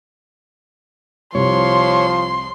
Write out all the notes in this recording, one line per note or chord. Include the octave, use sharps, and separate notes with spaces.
C2 F3 C#5 C6